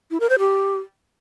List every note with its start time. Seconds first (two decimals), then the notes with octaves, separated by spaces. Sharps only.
0.11 E4
0.20 A#4
0.30 C5
0.39 G4